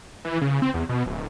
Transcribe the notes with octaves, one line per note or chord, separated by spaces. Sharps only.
E3
C#3
C4
E2
B2
D1